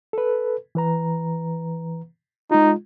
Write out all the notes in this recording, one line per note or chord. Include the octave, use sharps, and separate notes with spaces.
A4 B4
E3 B4 A#5
G#3 D#4 F4